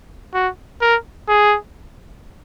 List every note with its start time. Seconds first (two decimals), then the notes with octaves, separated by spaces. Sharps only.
0.34 F#4
0.81 A#4
1.28 G#4